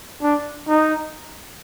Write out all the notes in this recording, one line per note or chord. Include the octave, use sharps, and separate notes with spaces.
D4
D#4